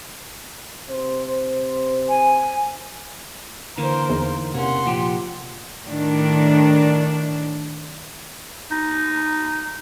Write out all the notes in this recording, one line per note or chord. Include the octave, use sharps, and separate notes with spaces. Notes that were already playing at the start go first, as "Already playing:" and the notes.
C3 C5
G#5
D3 E3 A#3 A#4 C5
E2 D#4
C3 A#3 C#4 F#5 C6
A#2 F3 G4
A2 D#3 D4
D#4